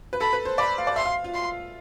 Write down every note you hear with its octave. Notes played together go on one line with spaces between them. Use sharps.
B4
A4 B5
B4
C5
D5 B5
F5
D5
E5 C6
F5
F4
C6